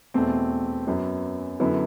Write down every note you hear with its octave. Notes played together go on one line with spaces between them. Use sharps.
E2 B2 A3 C4
F#2 F#3 B3
F#2 D3 F#3 B3 E4